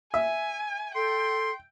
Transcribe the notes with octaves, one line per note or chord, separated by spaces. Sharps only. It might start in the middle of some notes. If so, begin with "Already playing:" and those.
E5 G#5
A4 G5 C6